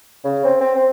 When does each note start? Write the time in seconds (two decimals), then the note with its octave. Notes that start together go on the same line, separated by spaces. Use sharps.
0.25 C#3
0.44 C4
0.61 C4
0.75 C4